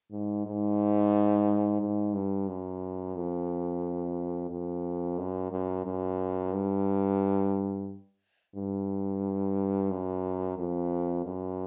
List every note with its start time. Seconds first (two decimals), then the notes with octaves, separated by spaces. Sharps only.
0.11 G#2
0.46 G#2
1.80 G#2
2.14 G2
2.48 F#2
3.16 F2
4.50 F2
5.18 F#2
5.51 F#2
5.85 F#2
6.53 G2
8.56 G2
9.90 F#2
10.58 F2
11.26 F#2